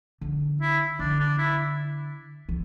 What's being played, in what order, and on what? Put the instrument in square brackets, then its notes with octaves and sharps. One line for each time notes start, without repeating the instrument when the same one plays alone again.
[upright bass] D3
[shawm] E4
[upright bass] D3 [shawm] D4
[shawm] D4
E4
[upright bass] E3